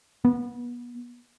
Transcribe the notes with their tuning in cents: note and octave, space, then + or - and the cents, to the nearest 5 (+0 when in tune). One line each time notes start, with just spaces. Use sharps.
B3 -30